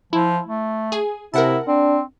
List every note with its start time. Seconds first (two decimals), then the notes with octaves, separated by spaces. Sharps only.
0.13 F3 E4
0.47 A3
0.92 G#4 G#5
1.34 C3 E4 A#4 F#5 A5
1.68 C4 D4